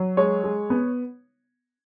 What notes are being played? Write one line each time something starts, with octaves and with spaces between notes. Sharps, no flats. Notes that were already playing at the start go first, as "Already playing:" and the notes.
Already playing: F#3
G#3 C#5
G#3
B3